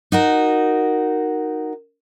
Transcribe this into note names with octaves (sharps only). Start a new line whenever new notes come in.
D#4 F#4 A#4